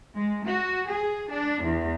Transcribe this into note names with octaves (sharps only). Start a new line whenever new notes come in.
G#3
F#4
G#4
D4
E2